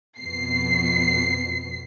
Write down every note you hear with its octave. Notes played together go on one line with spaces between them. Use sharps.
F2 B2 C7